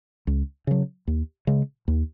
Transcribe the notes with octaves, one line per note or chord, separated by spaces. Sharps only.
C#2
C#3 F#3
D#2
C#3 G#3
D#2